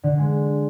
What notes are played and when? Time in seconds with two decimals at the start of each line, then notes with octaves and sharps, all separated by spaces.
0.03 D3
0.18 G#3